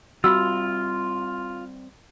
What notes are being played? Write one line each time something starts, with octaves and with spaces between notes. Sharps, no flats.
G3 C4 F4 F#4 B5 E6